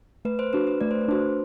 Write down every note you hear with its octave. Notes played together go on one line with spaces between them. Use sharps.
A3 B4
C5
D4 F#4 B4
B4
A3 D5
C5
B4
D4 F#4 C5